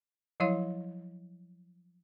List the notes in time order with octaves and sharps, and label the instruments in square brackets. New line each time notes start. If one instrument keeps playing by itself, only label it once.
[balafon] F3 F#3 E4 C#5 F5 C6